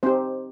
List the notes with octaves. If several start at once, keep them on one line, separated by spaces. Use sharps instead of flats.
C4 D#4 G4 C5